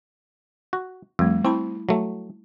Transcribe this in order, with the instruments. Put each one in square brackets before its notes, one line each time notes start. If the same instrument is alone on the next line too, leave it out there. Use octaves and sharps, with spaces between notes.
[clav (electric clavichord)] F#4
[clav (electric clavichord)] F2 [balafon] G3 A3
[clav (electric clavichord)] C4 [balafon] E4 A5 B5
[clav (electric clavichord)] F#3 A3